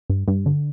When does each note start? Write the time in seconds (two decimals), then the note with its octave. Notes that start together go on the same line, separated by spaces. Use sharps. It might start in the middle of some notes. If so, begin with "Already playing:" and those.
0.10 G2
0.28 G2
0.46 D3